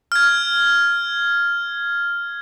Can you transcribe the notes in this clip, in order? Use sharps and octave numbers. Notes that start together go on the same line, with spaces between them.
F6 G#6